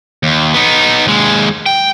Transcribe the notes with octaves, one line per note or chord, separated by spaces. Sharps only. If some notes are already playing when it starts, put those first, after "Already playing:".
D#2
B3 D#4
D#2 G#3
G5